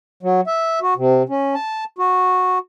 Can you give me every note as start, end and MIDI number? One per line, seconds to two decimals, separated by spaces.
0.23 0.41 54
0.47 0.79 76
0.82 0.94 66
0.97 1.23 48
1.29 1.54 61
1.55 1.84 81
1.98 2.58 66